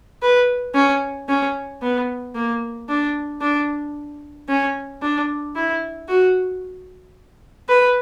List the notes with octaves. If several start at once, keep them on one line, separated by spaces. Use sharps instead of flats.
B4
C#4
C#4
B3
A#3
D4
D4
C#4
D4
E4
F#4
B4